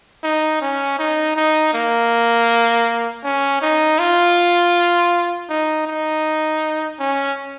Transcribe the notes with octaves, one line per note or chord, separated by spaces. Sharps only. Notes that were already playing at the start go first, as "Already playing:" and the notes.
D#4
C#4
D#4
D#4
A#3
C#4
D#4
F4
D#4
D#4
C#4